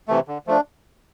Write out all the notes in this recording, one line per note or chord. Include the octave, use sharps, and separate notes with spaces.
C3 E3 A3
D3
F3 A3 D4